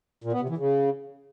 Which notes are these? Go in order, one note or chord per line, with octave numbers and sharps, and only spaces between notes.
A#2
B3
C3
E3
C#3